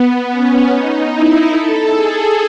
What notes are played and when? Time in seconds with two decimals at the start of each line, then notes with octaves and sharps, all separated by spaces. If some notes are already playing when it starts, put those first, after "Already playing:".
Already playing: B3
0.30 C#4
0.70 D#4
1.10 E4
1.50 A4
1.90 G#4